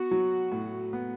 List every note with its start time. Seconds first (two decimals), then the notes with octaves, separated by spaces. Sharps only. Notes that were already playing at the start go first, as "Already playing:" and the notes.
Already playing: B3 F#4
0.11 F#3
0.52 A2
0.93 B3